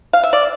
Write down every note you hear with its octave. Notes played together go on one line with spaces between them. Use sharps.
F5
E5
D5